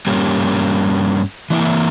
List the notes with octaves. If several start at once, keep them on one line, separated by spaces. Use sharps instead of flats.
G2 G3 A#3 C#4
E3 A#3 E4